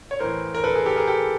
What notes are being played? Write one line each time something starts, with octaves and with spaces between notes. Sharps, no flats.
C#5
A2 E3 A#4 C5
A#4
A4 B4
G#4 A#4
G4 A4
G#4 A#4
G4 A4